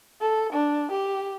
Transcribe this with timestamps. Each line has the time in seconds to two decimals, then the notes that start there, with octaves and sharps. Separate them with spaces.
0.21 A4
0.53 D4
0.91 G4